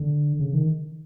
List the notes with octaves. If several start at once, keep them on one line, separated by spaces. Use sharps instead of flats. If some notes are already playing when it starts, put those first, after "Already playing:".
Already playing: D3
C#3
D#3